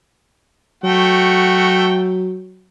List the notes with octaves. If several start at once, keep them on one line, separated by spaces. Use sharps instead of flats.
F#3 A3 F#4 G5